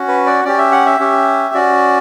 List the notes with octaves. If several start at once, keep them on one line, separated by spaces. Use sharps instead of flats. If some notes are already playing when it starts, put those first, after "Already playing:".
Already playing: C#4 F#4
B4
D5
C#4 G4 D5
E5
F#5
E5
C#4 G4
C#4 F#4 D5